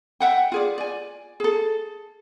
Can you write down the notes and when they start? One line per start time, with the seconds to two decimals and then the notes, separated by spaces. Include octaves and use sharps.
0.20 E5 F#5 G5
0.52 F4 G#4 D5
0.78 D5 G#5
1.40 G#4 A4